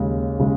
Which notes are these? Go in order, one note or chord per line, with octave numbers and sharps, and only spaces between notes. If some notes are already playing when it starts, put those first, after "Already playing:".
Already playing: D#2 C#3 G#3
C#3 G#3